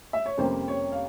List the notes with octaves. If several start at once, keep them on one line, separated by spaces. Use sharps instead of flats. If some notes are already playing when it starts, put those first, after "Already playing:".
E5
C#5
F2 C3 G3 A#3 C#4 C5
C#5
F5